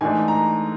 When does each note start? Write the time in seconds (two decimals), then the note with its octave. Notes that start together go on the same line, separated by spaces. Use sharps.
0.01 G#2 E3 A3 D4 G#5
0.28 A#5